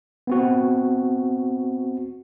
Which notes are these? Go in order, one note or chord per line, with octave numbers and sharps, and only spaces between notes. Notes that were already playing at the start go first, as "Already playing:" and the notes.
B3 C4 F#4